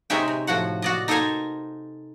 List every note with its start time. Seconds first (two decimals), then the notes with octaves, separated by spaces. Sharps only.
0.10 C3 G#3 C#4 D#4 E5 G5
0.28 C3
0.47 A2 F3 F#4 F#5
0.82 F#4 D5 D#5
1.08 D#4 A4 A#4 C5 G#5 A#5